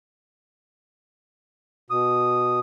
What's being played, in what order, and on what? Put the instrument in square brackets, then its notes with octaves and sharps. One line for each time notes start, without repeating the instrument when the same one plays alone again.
[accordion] B2 D#6